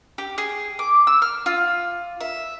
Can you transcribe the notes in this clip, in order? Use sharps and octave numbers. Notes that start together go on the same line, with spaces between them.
G4
G#4
D6
E6
F6
F4
E5